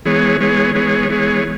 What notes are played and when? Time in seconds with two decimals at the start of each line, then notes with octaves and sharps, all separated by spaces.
0.05 E3 G#3 B3 G#4 C#5
0.41 E3 G#3 B3 G#4 C#5
0.74 E3 G#3 B3 G#4 C#5
1.09 E3 G#3 B3 G#4 C#5